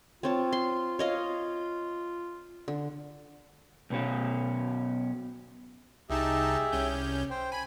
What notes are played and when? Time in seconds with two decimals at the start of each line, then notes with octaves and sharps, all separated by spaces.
0.23 C4 F4 C#5 A5
0.52 C6
0.99 C#5 D#5 F5
2.68 D3
3.90 B1 B2 C#4
6.10 C2 D#4 G4 G#4 E5 A5
6.73 C2 C#4 G6
7.30 C5 G5
7.52 G#5 B5